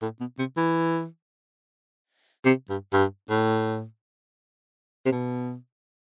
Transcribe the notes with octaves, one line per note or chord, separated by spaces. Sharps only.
A2
B2
C3
E3
C3
G2
G2
A2
C3
B2